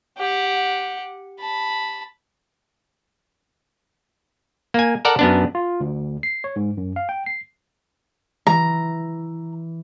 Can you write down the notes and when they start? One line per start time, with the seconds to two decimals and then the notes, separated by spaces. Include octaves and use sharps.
0.18 G4 F#5
1.40 A5 B5
4.74 A#3 G#5
5.05 A4 A#4 D5 F#5
5.19 F#2 B3 D4
5.55 F4
5.80 D2
6.23 C7
6.44 C#5
6.56 G#2
6.77 F#2
6.96 F5
7.09 G5
7.26 C7
8.47 E3 A#5